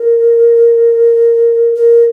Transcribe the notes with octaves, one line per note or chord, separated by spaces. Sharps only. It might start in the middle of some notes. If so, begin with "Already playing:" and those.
Already playing: A#4
A#4